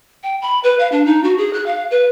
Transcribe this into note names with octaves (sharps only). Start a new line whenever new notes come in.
G5
B5
B4
F5
D4
D#4
F#4
G#4
F#6
F5
B4